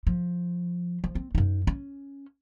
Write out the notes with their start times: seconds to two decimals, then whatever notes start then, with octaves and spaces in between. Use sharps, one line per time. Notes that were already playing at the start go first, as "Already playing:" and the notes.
0.07 F3
1.04 F3
1.15 C4
1.35 F#2 D#4
1.67 C#4